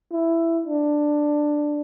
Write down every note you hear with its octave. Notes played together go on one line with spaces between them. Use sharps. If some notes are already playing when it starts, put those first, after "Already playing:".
E4
D4